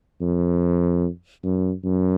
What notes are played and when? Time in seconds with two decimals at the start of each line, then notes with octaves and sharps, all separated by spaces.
0.21 F2
1.44 F#2
1.84 F#2